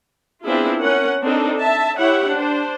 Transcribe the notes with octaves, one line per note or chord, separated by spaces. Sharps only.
B3 C4 D4 E4 F4 G#4
C#4 A#4 F#5
C4 D4 D#4 A4
E5 A5
E4 G4 C#5 F#5
D4 C5